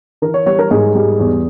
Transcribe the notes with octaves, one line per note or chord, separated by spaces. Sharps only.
E3 A#4
C#5
G3 C#5
A#4
G#2 G#4
G3
E2